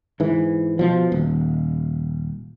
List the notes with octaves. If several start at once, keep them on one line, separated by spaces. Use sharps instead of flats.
G#2 E3
B2 F3
D#1